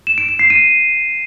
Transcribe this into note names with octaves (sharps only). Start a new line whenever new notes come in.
E7
D7
E7
C7
D#7